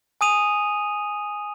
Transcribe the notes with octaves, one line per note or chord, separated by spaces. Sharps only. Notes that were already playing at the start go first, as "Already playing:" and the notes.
G#5 D#6 D#7 F7